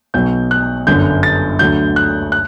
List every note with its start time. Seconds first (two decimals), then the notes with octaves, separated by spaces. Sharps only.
0.14 B1 B2 F#3 G6
0.51 F#6
0.87 G1 F#2 D3 G6
1.23 A6
1.59 D2 D3 F#3 G6
1.96 F#6
2.32 F#6